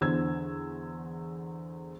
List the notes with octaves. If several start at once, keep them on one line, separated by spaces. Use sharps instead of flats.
E2 D3 C5 E6 G#6